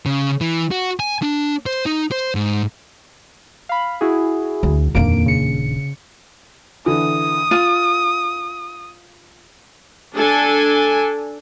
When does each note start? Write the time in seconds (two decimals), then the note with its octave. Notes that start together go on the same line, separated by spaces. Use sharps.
0.06 C#3
0.41 E3
0.72 F#4
1.00 G#5
1.22 D4
1.66 C5
1.86 D#4
2.11 C5
2.35 G#2
3.69 F5 B5
4.01 E4 F#4 G#4
4.63 D2
4.95 D#1 F2 A#3 D4 D7
5.26 C#3 C#7
6.86 D3 E3 D#6
7.51 F4 D#7
10.15 D4 A4 G#5